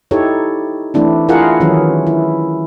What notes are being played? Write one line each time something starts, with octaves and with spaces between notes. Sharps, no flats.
D#4 E4 G4 A4 C#5
E3 A3 C4 D4 E4
E4 F4 G#4 A#4 F5 F#5
D#3 E3 F#3 C#4 G#4
E4